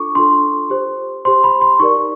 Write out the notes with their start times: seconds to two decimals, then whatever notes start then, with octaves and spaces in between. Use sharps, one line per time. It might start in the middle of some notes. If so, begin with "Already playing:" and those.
Already playing: D4 F4 A4 C#6 D6
0.15 D4 F4 A4 C6
0.70 G4 C5
1.25 G4 C5 C6
1.44 B5
1.61 C6
1.80 D#4 G4 A#4 D5 C#6